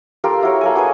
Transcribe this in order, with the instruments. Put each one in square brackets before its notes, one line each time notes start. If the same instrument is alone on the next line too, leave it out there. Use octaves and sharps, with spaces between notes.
[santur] F4 G4 A4 A#4
E4 F#4 A#4 C#5
A#3 A4 G#5
F#4 G#4 B4